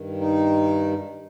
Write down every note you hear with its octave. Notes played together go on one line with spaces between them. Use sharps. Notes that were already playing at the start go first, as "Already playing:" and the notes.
Already playing: G2 D#3
D#4